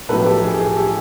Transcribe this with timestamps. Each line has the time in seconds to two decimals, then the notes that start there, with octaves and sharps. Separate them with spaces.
0.09 B1 A2 F3 A4 B4
0.26 G4 A4
0.43 G#4
0.60 G#4
0.76 G4 A4